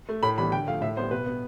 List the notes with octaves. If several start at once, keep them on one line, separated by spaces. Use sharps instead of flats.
A3
A2 B5
E3 G3 B3 B5
D3 G5
F3 A3 F5
A2 E5
G3 B3 C5
B2 B4
B3